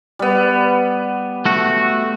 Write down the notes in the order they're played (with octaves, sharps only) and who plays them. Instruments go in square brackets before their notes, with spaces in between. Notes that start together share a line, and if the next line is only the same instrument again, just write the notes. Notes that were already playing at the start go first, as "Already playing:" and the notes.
[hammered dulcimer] G3 B3
[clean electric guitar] A3 F#4